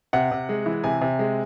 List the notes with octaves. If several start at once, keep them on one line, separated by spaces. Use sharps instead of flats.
C3 F#5
C3
G#3
E3
C3 G#5
C3
G#3